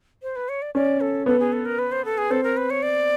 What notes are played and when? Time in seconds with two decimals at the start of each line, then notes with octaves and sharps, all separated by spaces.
0.23 C5
0.36 B4
0.49 C#5
0.62 D5
0.75 C#4 D5
1.01 A4
1.26 B3 A4
1.40 G#4
1.53 A4
1.65 A#4
1.79 B4
1.92 C5
2.05 A4
2.18 G#4
2.30 C4 A4
2.44 A#4
2.57 B4
2.70 C#5
2.83 D5